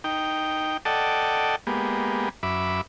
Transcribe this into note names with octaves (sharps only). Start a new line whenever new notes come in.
D#4 G5
A4 D5 D#5 F#5 G5 A5
G#3 A#3 B3 G4
F#2 E5 B5 D6